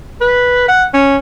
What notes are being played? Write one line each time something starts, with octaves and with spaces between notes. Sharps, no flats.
B4
F#5
C#4